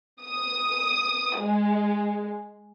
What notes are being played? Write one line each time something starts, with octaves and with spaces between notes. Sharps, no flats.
D#6
G#3